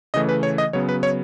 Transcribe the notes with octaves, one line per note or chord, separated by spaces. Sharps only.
C#3 E3 A3 D#5
B4
C#5
D#5
C#3 F#3 B3 C#5
B4
C#5